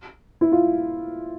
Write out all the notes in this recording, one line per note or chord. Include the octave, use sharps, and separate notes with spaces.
E4
F4